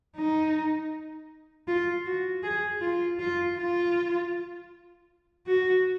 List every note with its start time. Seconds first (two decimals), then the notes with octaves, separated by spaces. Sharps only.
0.16 D#4
1.68 F4
2.06 F#4
2.43 G#4
2.81 F4
3.19 F4
3.57 F4
5.46 F#4